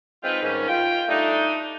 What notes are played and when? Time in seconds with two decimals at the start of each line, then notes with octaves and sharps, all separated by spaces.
0.24 G#3 C4 D#4 F4 B4 G5
0.43 G#2 D#3 G3 C#4
0.68 F4 G5
1.08 G3 A3 D4 D#4